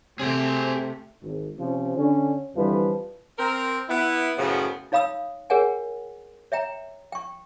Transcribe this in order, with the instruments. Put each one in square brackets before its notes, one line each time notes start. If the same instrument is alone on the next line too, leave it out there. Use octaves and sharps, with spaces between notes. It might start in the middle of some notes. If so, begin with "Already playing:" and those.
[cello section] C3 [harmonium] A3 [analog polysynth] C4 [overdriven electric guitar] G#4 G5
[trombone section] G#1
C3 F3 C#4
D3 C#4
F2 D3 E3 F3 G3 B4
[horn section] C4 A#4
B3 E4
F#2 A2 C#3 F3 B3
[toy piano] D#4 C#5 F5 B5 D#6 E6
G#4 A#4 C#5 F#5 G#5
C#5 E5 G5 A#5
G5 C#6